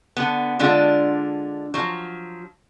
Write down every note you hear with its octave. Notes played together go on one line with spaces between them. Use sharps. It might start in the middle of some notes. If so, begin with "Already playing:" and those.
D3 B3
D3 G#3 D4 F4
F3 F#3